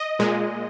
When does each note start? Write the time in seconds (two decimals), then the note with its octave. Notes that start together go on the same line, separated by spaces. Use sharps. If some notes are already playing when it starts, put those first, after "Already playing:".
Already playing: D#5
0.19 A#2 G#3